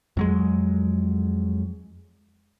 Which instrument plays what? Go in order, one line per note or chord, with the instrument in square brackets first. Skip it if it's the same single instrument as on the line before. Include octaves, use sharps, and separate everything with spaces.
[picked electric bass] F2 F#3 G#3